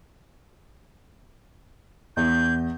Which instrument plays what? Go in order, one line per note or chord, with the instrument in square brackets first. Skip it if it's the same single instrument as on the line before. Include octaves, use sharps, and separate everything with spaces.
[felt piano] E2 [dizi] G6